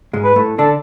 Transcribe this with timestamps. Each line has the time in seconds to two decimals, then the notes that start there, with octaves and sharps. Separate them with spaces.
0.13 G#2 G#3
0.25 B4
0.36 A2 A3
0.58 D3 D4 A4